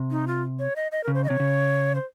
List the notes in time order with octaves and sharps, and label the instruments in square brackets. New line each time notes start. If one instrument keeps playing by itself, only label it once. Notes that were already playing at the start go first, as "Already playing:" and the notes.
Already playing: [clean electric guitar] C3
[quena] D#4
F4
C#5
D#5
D#5
[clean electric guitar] C#3 [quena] A#4
[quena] C5
D#5
[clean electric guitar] C3 [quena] C#5
[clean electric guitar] C#3
[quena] C5